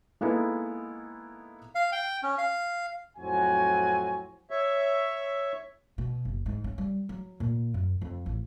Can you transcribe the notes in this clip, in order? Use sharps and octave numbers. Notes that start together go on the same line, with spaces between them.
G#3 A#3 B3 D#4 E4 A4
F5
G5
C#4
F5
F2 A2 F#3 C4 F#4 G#5
C#5 E5
B2
F#1
G#2
C#4
G3
F#3
A#2
F#2
F2
A1